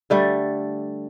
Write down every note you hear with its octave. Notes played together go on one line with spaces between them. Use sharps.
D3 G3 A3